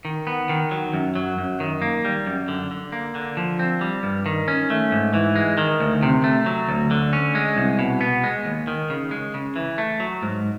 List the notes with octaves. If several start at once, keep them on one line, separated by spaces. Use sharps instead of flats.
D#3
B3
D#3
F#3
F#2
F#3
F#2
D#3
A#3
G3
F#2
D3
D3
A#3
D3
F3
C4
G3
G2
D#3
C#4
A3
G#2
E3
G#3
D#3
D2
C3
A3
F#3
D2
D3
C#4
G#3
C2
B2
B3
G#3
D#2
D#3
C#3
G#3
C#3
E3
A3
F#3
G#2